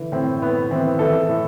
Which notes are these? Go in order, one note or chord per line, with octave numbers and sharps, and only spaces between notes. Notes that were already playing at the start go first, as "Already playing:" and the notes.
Already playing: D3 E3
A2 C4
A2 B3
E3 C4
E3 A4
A2